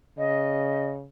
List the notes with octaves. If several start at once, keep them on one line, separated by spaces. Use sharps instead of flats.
C#3 D#5